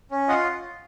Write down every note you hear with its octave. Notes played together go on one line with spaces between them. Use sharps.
C#4
F4 D#5 F#5